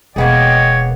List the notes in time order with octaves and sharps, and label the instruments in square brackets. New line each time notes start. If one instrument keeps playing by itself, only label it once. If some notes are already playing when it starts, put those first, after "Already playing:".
[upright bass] E1 [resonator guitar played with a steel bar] A#3 B3 G#4 [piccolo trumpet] C#5 [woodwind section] D#5 G5